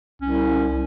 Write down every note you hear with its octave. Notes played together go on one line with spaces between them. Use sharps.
C2 C#4